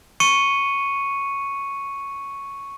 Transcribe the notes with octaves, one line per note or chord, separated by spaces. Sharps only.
C#6 C#7 D#7